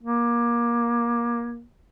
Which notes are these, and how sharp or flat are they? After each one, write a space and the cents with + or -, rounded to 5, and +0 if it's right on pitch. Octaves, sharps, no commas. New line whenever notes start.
A#3 +25